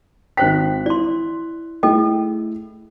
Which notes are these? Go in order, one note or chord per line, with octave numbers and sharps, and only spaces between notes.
G#1 C5 G5 F#6 B6
E4 D5 C6
A3 E4 G#4 A4 D#5 G5